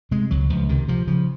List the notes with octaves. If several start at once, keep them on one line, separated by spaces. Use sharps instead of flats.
C3 G#3
C#2 F#3
C#2 F3
C3 D#3
C3 F3
C#3 F3